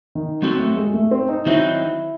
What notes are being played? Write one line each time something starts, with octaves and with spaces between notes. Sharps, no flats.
D#3
F#3 C4 F#4 A4
A3
G#3
A3
C4
D#4
D#3 F#3 C4 D#4 E4 F#4